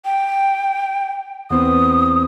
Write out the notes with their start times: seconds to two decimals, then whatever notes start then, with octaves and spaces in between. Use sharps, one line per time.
0.05 G5
1.50 E2 C4 B4 D#6